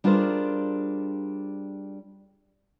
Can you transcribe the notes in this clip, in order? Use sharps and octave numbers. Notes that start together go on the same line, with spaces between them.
G3 D4 F4 G#4 A#4 C5